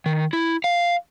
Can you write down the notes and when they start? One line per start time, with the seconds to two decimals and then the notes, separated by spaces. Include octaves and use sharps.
0.06 D#3
0.33 E4
0.64 F5